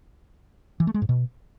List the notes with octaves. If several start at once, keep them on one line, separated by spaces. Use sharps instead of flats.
E3
A3
G#3
G#2
B2